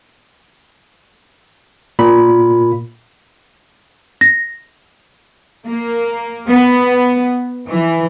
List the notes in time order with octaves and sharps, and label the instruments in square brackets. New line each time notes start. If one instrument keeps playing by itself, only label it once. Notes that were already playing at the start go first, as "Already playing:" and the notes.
[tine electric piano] A#2 B5
[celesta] A#6
[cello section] A#3
B3
E3